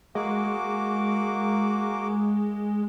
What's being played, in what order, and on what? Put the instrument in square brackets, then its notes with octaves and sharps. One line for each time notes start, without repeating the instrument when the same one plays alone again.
[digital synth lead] G#3 [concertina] A#3 F#4 D6